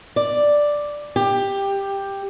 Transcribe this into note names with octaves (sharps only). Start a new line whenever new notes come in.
D5
G4